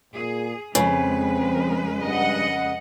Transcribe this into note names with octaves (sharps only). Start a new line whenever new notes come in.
A#2 G#4
F2 C#3 G#3 C4 B4
G2 D#5 F#5